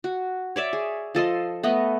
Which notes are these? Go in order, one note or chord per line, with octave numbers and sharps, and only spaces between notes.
F#4
C#5 D5 E5
G#4
F3 A4 D#5 C6
A3 B3 D#5